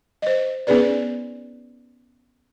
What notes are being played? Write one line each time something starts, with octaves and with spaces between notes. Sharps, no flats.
C5 D#5
B3 C#4 D#4 G#4 B4 D5